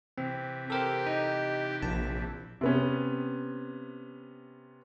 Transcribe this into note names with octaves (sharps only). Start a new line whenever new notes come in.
C3 E3 C4
G4 A4 A#4 C5
D#4
A#1 A5
C3 B3 C#4